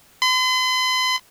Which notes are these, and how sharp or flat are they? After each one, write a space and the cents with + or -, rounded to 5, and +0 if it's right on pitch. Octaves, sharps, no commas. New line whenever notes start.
C6 -45